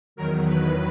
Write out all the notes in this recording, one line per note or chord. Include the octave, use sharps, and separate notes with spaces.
E2 D#3 F#3 A#4
B4